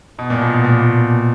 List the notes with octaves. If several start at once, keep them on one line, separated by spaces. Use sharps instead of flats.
B2
A#2
B2
B2
A#2